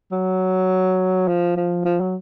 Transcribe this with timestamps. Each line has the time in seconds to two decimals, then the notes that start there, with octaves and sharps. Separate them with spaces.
0.12 F#3
1.28 F3
1.57 F3
1.85 F3
2.01 F#3